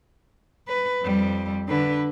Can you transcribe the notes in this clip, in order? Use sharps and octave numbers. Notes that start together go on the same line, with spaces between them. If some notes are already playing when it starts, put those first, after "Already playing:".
B4
F2 G3
D3 B4